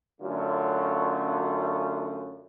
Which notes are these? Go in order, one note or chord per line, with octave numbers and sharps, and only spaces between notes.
F#2 D3 A3 C#4 F4